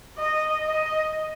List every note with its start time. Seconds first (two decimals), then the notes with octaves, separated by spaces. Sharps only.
0.17 D#5
0.66 D#5